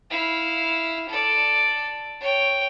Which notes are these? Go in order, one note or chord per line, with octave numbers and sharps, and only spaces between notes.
E4 F5
A4 D5
C#5 G5